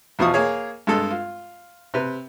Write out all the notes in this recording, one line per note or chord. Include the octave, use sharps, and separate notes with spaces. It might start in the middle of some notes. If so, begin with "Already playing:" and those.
E2 B2 F3 F4 C#6 D#6
A#3 G#4 C#5
G2 G#3 A4
F4
C3 B4